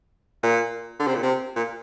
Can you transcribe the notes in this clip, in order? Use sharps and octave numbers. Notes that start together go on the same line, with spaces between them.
A#2
D3
C3
A#2
C3
A#2